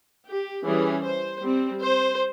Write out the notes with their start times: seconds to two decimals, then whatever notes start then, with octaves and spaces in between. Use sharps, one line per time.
0.27 G4
0.65 E3 G3 C#4 G#4
1.04 C5
1.43 G3 C4
1.82 C5